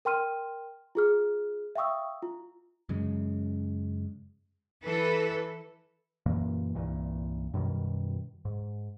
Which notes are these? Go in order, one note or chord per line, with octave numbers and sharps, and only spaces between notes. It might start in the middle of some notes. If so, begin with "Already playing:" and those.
A#4 G5 C6 F6 D#7
F4 G#4 F6
E5 F5 G5 C#6 D#6 E6
F4
F#2 C#3 G#3
E3 A4 B4
F#2 A#2 E3 A#3
C2 G2 A#2 E3
F#2 B2 D#3 G3
G#2